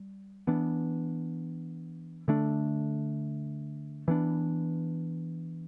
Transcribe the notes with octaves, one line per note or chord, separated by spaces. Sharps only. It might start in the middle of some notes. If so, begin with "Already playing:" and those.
Already playing: G3
E3 B3 D4
D3 A3 D4
E3 B3 D4